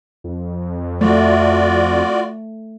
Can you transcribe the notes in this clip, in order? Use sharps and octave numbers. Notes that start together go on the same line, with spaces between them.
F2
A3 F4 F#4 D5